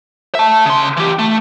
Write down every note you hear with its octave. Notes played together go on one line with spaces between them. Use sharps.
E5 A5
C#3 C6
E3 G4
A3